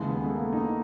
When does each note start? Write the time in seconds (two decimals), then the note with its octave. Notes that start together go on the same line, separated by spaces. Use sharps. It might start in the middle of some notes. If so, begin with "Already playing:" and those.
Already playing: D#2 C#3 E3 G#3
0.09 B3
0.25 A3
0.31 A#3
0.53 D#4